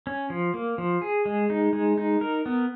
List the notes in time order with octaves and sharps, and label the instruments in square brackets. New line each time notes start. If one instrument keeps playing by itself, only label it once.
[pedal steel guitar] C#4
F3
A#3
F3
G#4
G#3
D#4
G#3
D#4
A#4
B3